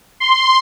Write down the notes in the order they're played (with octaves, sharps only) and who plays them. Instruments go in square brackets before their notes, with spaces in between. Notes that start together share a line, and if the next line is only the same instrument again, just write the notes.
[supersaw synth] C6